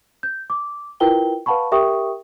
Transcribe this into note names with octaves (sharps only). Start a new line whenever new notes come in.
G6
D6
E4 F4 A#4 B4 G5 G7
B4 F5 F#5 A5 B5 C#6
G4 A#4 E5 G5 C#6 D#6